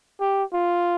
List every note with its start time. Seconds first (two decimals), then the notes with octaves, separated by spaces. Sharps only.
0.21 G4
0.53 F4